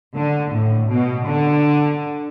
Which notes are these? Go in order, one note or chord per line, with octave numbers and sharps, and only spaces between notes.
D3
A2
B2
D3